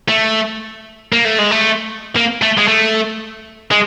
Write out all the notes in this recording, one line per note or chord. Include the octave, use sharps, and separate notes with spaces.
A3
A#3
A3
G#3
A3
A#3
A3
G#3
A3
G#3